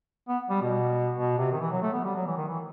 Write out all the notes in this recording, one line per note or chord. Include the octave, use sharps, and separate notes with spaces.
B3
G3
B2
B2
C3
D#3
E3
F#3
A3
B3
G3
F#3
E3
D#3
E3